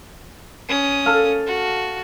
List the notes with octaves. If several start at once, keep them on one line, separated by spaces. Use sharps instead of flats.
C#4 D#6
A4 F5
F#4